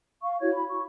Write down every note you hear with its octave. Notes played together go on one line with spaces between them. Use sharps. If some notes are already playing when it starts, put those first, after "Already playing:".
F5 C#6
E4 F#4 C#5 G#6
B5
C#6